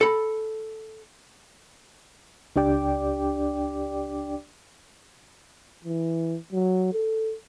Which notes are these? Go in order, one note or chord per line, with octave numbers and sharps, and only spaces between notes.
A4 B5
C#2 D4 G4 D5 G5 D6
E3
F#3
A4